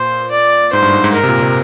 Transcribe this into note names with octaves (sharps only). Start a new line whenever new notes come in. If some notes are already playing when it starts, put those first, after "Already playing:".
Already playing: A#2 C5
D5
G#2 C5
G2
G#2
G#2
A#4
C3
A#2
C3